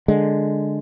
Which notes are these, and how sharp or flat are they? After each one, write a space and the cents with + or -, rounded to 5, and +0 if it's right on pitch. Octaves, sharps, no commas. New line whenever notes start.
D3 +5 G#3 +5